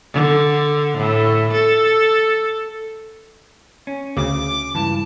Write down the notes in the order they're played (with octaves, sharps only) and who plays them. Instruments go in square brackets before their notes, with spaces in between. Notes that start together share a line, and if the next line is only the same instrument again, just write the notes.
[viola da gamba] D3
A2
A4
[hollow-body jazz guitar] C#4
[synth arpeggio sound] D2 C#3 [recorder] D6
[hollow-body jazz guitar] C#2 G2 E3 [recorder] A5